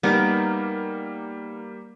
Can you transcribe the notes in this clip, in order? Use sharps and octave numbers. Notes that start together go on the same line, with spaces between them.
G3 A#3 B3 D#4 A#4 D6